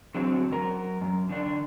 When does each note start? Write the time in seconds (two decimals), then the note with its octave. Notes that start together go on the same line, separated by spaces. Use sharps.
0.15 D3 F#3 C4
0.51 F#2 A#4
1.01 F#2
1.29 D3 D#3 D4